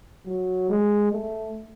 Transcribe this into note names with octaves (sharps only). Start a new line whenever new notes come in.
F#3
G#3
A3